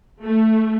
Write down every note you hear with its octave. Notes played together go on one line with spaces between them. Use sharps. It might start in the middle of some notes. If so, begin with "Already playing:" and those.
A3